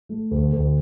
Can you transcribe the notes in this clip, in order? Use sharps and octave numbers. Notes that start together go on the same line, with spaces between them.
A3
D2
D2